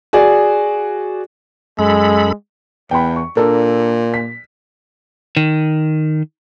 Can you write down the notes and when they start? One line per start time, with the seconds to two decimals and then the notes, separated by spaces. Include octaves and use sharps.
0.13 F#4 G#4 D5
1.79 F#2 G#3 A4 B5
2.91 E2 G5 B5
3.16 C#6
3.37 A#2 D4 A4 A#4
4.14 B6
5.37 D#3